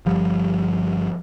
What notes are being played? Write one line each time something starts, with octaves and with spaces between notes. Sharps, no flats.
G1 F3 G3